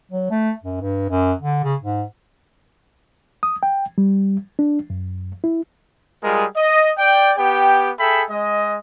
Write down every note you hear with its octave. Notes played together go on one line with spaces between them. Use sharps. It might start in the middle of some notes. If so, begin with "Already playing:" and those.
F#3
A3
F#2
G2
F#2
D3
C#3
G#2
D#6
G5
G3
D4
F#2
E4
G3 G#3 F4 G#4 A#4
D#5
D5 G5
B3 G4 G5
G#4 A4 E5 G5 B5
G#3 D#5